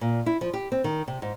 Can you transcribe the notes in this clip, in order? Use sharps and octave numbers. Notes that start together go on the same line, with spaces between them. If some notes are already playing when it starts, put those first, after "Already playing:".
A#2
E4
F3
G4
C4
D#3
C3
G#2